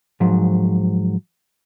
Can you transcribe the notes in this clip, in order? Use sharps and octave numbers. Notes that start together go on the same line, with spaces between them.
G#2 F3 F#3